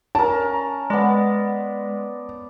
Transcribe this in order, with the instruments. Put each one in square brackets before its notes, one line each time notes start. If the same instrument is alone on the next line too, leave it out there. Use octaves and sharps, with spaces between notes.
[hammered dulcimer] C#4 A#4 [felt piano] A5
[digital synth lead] G#3 [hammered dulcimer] B3 D5